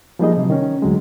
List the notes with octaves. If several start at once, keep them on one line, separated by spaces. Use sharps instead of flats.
F3 G3 A#3 D#4 G#4 D#5
C3 F#3
D#3 C#4
D2 F#3 G#3